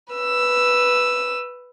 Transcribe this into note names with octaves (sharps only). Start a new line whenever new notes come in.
B4 E6